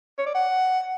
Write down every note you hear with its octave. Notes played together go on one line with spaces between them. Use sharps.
C#5
D5
F#5